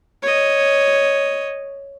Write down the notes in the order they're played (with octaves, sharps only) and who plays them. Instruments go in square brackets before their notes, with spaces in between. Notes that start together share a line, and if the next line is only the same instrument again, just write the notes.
[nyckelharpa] C#5 D#5